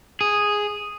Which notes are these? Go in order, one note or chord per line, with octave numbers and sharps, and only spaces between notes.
G#4